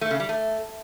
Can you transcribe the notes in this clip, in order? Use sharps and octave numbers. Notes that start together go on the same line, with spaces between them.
A3
C#3
G3
A3